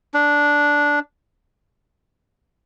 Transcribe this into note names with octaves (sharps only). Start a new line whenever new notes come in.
D4